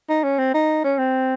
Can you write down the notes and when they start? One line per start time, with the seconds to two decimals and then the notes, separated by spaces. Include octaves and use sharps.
0.09 D#4
0.24 C#4
0.39 C4
0.54 D#4
0.84 C#4
0.99 C4